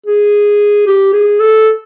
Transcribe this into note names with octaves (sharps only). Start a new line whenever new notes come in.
G#4
G4
G#4
A4